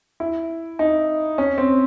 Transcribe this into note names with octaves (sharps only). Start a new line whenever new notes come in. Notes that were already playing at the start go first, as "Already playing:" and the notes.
E4
D#4
C#4
C4